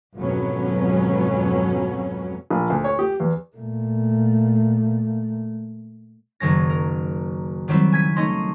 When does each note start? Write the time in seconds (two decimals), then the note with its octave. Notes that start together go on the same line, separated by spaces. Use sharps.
0.15 G#1 F2 B2 F#3 B3 C#4
2.50 A#1
2.70 D2
2.84 C#5
2.99 G4
3.20 E2
3.56 A#2 A3
6.40 F#1 D#3 C#4 A#6
6.69 A#4
7.68 D#3 F#3 G3 C4 E4
7.93 G#5 G#6 B6
8.16 A3 C#4 D#4 D#5 C6